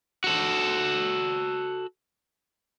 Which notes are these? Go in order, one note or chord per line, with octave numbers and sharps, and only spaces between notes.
F#4 A4